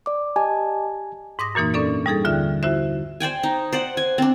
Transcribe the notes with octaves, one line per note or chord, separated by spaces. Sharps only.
D5 D6
G4 D#5 G#5 A5
G#2 D6 D#6 A#6
F#2 A#2 E3 A#3 D#4
C#4 D4 A4 D5
G3 D#4 G#4 A4
D#2 D3 F4 E5 F#6
E4 F#4 C5 E5
C5 D5 G5 G#5
D#4
C5 D5 F#5
G#5
C4 D4